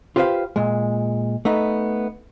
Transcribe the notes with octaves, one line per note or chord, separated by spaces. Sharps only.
F4 G4 B4 C5 D#5 F5
A#2 G#3
A3 B3 D#4